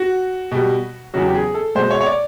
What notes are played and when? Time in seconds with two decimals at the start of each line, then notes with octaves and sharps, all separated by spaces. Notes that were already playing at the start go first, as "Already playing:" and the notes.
Already playing: F#4
0.52 B2 G3
1.14 E2 C#3 F#3 F#4
1.26 G4
1.35 G#4
1.54 A4
1.75 B2 G#3 C5
1.90 C#5
2.01 C#5
2.06 D5